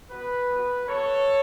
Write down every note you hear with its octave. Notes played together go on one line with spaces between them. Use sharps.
B3 F#4 B4
B3 F#4
B3 F#4 A4 C#5